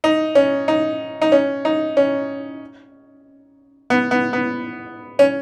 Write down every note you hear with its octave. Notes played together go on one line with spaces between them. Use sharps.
D#4
C#4
D#4
D#4
C#4
D#4
C#4
B3
B3
B3
C#4